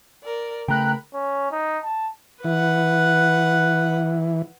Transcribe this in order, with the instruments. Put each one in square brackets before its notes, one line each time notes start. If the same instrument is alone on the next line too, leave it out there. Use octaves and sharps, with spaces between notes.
[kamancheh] A#4 D5
[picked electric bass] C#3 A3 [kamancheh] A#4 B5 [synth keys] G5 A#5 F#6
[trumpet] C#4
D#4
A5
[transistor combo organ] E3 [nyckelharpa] B4 F#5